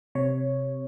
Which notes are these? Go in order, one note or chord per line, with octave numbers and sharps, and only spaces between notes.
C3 C#5